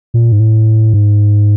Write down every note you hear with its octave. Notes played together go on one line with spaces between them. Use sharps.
A#2
G#2
A2
G#2